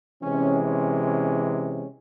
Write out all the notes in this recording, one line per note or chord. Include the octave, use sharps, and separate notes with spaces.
C3 E3 G#3 C#4
C#4
C#4
C#4